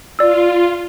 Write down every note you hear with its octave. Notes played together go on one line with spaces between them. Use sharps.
F4 D5 E6